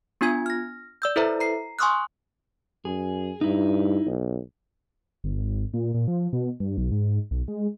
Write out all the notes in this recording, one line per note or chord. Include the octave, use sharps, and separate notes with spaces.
B3 D4 F4 G#5 G#6
F6 A#6
D5 E6 G6
E4 A4 B4 C5 E5 A#5
A#5 C7
G#5 C6 C#6 D#6 F6 F#6
F#2 G#4
G2 D#4 E4
B1
G1
G#1
A#2
A#2
F3
B2
G2
B1
G#2
B1
G#3